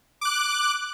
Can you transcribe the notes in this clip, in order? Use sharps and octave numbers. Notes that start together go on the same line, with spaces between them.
D6 F#6